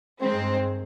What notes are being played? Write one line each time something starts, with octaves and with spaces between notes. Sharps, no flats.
G2 D#3 G#3 C4